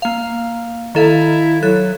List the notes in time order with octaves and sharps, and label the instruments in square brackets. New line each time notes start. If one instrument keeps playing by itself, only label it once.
[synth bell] A#3 F5
[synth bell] D#3 A4 F5 [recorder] E4
[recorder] F#3 [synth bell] A4 F#6